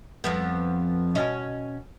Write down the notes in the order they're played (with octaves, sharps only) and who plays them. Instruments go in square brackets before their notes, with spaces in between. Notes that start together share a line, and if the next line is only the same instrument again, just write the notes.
[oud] F2 F3 B3
B2 C#4 D#5